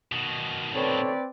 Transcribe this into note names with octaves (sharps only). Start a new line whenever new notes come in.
B2 D#3
C4 A4 B4 C#5 D5